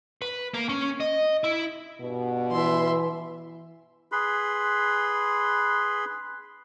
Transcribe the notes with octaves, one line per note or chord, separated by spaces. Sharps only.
B4
A#3
C#4
D#5
E4
G2 B2
E3 E5 C6
G#4 B4 B5 C6